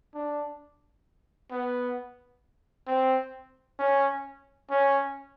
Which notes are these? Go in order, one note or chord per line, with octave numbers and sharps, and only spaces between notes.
D4
B3
C4
C#4
C#4